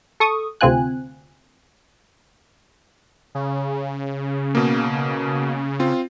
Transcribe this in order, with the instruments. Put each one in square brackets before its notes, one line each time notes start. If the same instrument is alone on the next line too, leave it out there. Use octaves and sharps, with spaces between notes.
[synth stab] A4 C#6 D#6
D2 C3 C4 F4 G#5 F#6
[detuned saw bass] C#3
[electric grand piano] B2 A#3
C4 F4